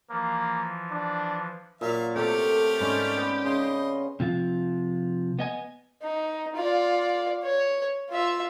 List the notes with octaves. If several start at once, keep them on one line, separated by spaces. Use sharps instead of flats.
E3 F3 A#3
D4
A#2 F#3 E5 F5 D6
C3 A3 G4 A4 G5 D6 F6
G#2 C#4 D5 B5
B3 G5
C#3 D#5 C6
C3 F3 F4
B3 D#5 G#5
D#4
F4 D5
C#5
F4 E5